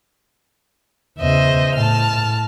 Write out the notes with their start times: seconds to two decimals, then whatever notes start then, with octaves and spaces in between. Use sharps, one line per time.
1.18 E2 C#3 C5 D#5 E5
1.75 A2 A5 F6